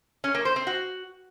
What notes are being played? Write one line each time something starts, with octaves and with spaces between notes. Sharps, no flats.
C#4
A#3
C5
C4
F#4